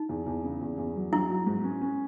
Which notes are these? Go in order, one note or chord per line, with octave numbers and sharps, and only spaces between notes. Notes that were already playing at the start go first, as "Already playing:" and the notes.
Already playing: D#4
E2
E2
C#3
E2
E2
F#3
F#3 E4
F#3
G#2
C#4
C#4